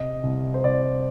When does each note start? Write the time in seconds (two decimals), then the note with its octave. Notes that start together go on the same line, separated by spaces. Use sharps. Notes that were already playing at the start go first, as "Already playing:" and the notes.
Already playing: C3 D#5
0.23 C2
0.54 C5
0.64 C2 D5